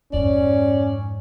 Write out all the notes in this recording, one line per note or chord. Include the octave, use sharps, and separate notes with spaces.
F2 G#2 C#4 D5